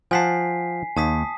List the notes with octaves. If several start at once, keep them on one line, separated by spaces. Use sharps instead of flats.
F3 F#5 G#5 A5 B6 C7
D#2 A5 D#6 B6